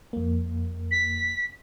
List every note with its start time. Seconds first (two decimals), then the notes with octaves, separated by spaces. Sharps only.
0.13 F2 A#3
0.91 B6